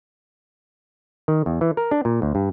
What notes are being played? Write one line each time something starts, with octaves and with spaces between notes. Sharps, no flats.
D#3
E2
E3
A#4
D4
A#2
D2
G2